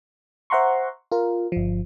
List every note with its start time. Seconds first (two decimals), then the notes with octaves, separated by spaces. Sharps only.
0.50 C5 E5 F#5 A#5 C6 C#6
1.12 F4 A#4
1.52 G1 F3